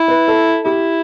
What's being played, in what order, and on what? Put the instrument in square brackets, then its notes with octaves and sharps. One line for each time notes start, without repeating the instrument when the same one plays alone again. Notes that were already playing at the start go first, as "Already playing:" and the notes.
Already playing: [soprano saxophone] E4
[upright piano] B4
A4
[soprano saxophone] E4 [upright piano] G4